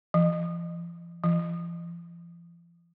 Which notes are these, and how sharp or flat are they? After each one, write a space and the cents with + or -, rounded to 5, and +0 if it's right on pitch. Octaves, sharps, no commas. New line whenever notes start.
F3 -45
F3 -45